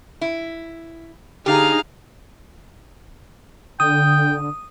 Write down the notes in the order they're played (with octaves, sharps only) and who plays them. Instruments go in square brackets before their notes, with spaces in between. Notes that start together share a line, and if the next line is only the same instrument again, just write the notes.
[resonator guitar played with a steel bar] E4
[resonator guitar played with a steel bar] D3 [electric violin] D#4 G#4 [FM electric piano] G4 [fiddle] F5 A#5
[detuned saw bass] D3 [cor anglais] G5 [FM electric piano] D#6